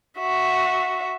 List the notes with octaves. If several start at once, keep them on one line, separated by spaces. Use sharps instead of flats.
F#4 E5